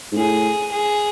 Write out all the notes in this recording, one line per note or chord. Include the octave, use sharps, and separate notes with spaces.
G#2
A2 G#4
G#4